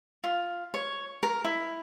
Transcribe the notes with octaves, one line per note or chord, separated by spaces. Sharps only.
F4
C#5
A#4
E4